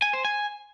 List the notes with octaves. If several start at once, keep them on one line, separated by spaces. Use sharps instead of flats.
G#5
C5
G#5